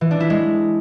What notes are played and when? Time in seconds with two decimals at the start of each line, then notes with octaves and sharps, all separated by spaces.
0.01 E3
0.11 D4
0.20 E4
0.30 G#3